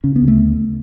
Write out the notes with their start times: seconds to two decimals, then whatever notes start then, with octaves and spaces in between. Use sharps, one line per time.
0.04 C#3 C#4
0.16 B3
0.21 D2
0.28 A3